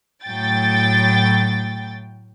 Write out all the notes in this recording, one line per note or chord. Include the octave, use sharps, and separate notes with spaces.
A2 F#3 G5 A6